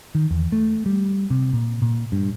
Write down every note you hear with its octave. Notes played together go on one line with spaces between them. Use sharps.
D#3
E2
A3
G3
C3
A#2
A#2
G2